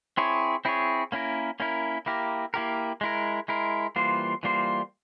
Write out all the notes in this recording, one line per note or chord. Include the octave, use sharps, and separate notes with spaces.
C4 E4 G#4 C#5
C4 E4 G#4 C#5
A#3 C#4 E4 A#4
A#3 C#4 E4 A#4
A#3 E4 G4 A#4
A#3 E4 G4 A#4
G#3 E4 A#4
G#3 E4 A#4
E3 G3 A#3 F4 C5
E3 G3 A#3 F4 C5